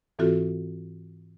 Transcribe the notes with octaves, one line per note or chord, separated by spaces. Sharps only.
G#2 E3 C4 F4 F#4 A4